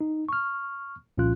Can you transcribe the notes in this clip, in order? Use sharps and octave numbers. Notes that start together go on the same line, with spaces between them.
D#4
C#6 F6
C2 A#2 F3 C#4 F4 F#6